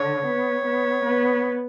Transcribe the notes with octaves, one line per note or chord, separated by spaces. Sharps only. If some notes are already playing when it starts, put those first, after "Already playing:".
Already playing: D3 C#5
B3
B3
B3